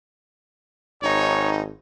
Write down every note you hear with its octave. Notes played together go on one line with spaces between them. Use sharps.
G#1 D#4 C#5